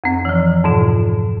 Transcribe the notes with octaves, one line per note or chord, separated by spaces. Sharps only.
F2 C4
E3 F3
F2 G#2 B2 F4